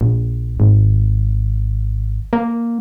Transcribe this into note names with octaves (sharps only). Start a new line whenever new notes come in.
A#1
G#1
A#3